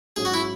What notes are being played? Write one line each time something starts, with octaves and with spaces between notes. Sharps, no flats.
G#2 F#3 C#4 G#4
F#4
E4